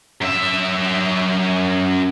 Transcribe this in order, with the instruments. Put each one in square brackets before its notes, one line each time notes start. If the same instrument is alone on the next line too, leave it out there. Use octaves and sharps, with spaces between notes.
[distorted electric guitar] F#2 E5